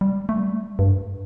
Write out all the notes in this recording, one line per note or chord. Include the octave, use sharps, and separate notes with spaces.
G3
A3
G3
G2